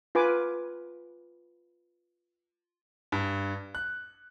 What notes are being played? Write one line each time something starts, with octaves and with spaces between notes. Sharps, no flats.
F4 B4 G#5 D6
G2
F#6